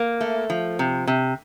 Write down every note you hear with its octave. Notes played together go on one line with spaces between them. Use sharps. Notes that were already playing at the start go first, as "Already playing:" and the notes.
Already playing: A#3
A3
F3
C3
C3